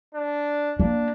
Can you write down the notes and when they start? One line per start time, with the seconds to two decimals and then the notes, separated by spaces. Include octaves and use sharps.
0.14 D4
0.80 A#3 D4